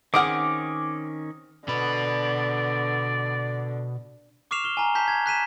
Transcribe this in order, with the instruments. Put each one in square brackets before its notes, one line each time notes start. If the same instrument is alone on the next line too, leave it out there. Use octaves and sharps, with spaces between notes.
[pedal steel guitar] D#3 C#4 [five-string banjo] C4 G#4 F#5 [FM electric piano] D6 [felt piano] D#6 F6
[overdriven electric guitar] B2 B4 [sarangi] D3 [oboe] D5
[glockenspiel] C#6 D6 F6 C7 E7 F7
F6 G7
G#5 A#5
A5 G6 B6
G#6
F#6 B6 D#7 E7